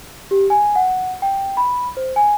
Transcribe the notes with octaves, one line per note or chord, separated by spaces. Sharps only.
G4
G#5
F#5
G5
B5
C5
G#5